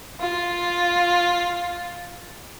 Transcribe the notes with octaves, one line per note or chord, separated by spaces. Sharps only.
F4